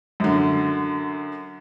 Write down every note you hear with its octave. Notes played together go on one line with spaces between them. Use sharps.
F#2 D3